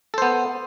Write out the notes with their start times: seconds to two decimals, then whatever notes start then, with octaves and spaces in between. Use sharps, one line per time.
0.14 A4
0.18 C5
0.22 B3